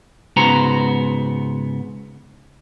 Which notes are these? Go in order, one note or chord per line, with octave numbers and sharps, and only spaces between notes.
G#2 C#3 B3 F#4 C5 A#5